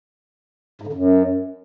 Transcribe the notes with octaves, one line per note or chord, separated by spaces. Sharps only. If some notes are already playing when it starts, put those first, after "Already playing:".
G#2
D3
F#2